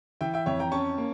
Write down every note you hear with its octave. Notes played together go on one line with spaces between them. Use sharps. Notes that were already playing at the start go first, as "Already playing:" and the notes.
E3 E5 G5
E5 G5
F2 C#5 E5
G5 A#5
C#4 A5 C#6
A#3